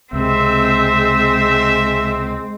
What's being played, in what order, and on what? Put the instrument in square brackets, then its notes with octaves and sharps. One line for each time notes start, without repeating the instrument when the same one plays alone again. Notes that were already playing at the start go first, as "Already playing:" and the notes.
[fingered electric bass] C#2 C3 [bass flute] G#3 [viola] C4 [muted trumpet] E5